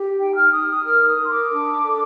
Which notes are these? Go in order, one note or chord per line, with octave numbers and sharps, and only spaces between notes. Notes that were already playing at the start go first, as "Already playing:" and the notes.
Already playing: G4
D#4 G5
F6
D#4 D#6
D#6
A#4 F6
D#6
A#4 C6
D6
D4
A4